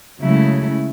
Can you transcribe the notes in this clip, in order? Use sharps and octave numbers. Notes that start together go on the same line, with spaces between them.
C#3 F#3 G#3 A3 E4